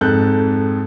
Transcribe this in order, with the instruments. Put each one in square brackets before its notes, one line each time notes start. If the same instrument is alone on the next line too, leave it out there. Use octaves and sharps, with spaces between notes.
[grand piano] F2 G#2 A4 F#6 G6